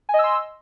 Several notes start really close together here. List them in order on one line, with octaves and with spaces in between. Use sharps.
G#5 D#5 E6 C6